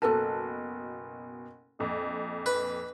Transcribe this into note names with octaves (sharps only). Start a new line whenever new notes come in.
F#1 B2 A4 B4 A5
A#1 F2
B4